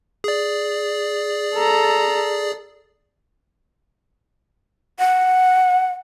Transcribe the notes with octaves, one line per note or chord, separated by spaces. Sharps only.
G#4 D5
A4 A#5
F#5